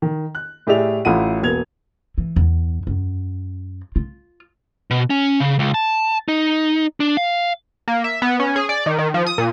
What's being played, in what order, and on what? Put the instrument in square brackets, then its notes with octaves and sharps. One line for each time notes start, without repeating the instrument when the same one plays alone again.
[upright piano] D#3
F#6
A2 G4 G#4 D5 E5 F7
A1 A3 E4 F4 F#5 D#7
E1 A#3 B3 G#6 F7
[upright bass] E3
E2
F#2
F4
[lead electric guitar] B2
C#4
C#3
C#2
A5
D#4
D4
F5
[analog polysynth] A#3
E5
B3
C#4
G#4
D5
D#3
D#3
F3
D#6
A#2